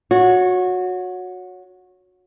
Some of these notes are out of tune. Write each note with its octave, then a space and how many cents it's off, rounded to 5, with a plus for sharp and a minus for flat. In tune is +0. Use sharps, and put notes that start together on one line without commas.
F#4 -20 C#5 +10